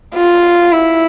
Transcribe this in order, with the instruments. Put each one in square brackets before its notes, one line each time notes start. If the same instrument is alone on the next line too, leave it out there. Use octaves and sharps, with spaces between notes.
[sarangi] F4
E4